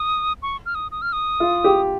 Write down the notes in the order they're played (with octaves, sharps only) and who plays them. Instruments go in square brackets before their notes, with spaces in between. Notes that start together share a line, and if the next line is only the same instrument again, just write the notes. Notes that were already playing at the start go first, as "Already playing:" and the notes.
Already playing: [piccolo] D#6
C#6
F6
D#6
D#6
F6
D#6
[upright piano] F4
G4